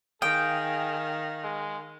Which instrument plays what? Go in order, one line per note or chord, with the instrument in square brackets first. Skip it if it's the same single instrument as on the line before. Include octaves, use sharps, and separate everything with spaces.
[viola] D#3 [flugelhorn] G#4 [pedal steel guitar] F5 D#6 [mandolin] G5
[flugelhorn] G#3